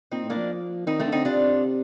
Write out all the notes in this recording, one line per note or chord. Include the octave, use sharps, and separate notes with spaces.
A#2 C4 D#4
A2
A#3 D4
F3
D#3 C4 D#4
A3 C4
D3
C4 D#4
C3 D4 F4